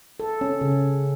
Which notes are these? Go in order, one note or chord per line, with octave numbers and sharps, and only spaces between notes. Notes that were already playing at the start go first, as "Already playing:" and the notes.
A4
C#4
C#3